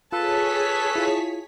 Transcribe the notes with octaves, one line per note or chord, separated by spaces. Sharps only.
F4 G#4 A4 B4 C#5 A5 B6
E4 F4